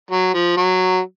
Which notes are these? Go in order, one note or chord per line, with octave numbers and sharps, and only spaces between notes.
F#3
F3
F#3